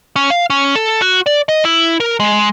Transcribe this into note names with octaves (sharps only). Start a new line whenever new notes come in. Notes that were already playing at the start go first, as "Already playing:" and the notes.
C#4
F5
C#4
A4
F#4
D5
D#5
E4
A#4
G#3